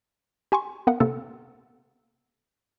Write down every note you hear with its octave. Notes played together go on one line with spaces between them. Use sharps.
G4 G#5 C6 C#6
B3 A#4 F5 F#5
C3 A#3 A4